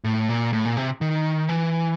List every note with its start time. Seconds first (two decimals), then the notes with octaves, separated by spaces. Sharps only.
0.04 A2
0.29 A#2
0.53 A2
0.65 A#2
0.77 C3
1.01 D#3
1.49 E3